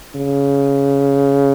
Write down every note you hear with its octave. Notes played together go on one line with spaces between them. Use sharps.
C#3